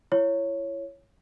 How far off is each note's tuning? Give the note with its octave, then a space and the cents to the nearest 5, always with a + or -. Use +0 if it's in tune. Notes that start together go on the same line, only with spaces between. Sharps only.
E4 +35 C#5 +0